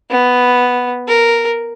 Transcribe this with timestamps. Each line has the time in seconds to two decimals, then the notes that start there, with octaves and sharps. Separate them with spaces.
0.10 B3
1.08 A#4